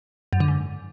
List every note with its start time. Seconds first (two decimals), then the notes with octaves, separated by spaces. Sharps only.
0.33 F#2
0.40 D3
0.48 G#2